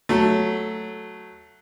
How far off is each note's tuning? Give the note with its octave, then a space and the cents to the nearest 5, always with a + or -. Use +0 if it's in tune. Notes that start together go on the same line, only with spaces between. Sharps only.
F#3 +0 A3 +0